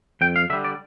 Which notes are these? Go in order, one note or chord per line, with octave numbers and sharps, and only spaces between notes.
F2 G5
F5
D3 G3 E5
D5